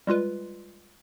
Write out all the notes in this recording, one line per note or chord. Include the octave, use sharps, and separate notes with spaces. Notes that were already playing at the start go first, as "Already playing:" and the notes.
G3 G#3 F4 B4